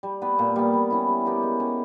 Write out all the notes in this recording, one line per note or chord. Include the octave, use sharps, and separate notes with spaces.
G3
B3 G4 B4
A#2
G3 B3
G3
C#4 E4
G3
B3 G4 A#4
G#3
C#4 G4